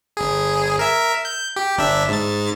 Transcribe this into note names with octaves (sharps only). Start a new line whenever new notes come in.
G1 G#4
A#4 E5
G6
G4
G1 D4 E5
G#2 A6